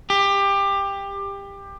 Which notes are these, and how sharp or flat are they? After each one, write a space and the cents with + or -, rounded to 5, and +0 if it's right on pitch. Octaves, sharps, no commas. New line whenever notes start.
G4 +20